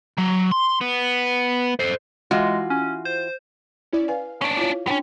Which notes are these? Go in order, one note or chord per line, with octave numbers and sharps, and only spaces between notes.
F#3
C6
B3
A4 C5
E3 G#3 F4 F#4
C#4
C5
C#4 E4 D5
B4 F5 G#5
C#4 D4 C#6
E4 F4 C#5
B3 C#4 D4 G5